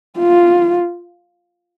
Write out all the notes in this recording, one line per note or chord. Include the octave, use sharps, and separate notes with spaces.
F4